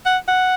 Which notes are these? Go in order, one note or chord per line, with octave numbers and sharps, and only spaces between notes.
F#5
F#5